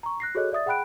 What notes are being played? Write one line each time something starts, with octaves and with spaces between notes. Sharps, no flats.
A#5 C#6
F#6 A#6 C7
F#4 G#4 A4 C#5 D#5 F#6
D5 E5 D#6 A6
G#4 F#5 G5 B5 F#6 D7